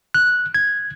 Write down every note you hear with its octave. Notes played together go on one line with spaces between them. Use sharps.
F#6
G#6